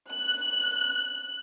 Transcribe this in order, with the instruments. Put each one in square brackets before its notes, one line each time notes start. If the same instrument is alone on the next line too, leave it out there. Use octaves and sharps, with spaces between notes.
[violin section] F#6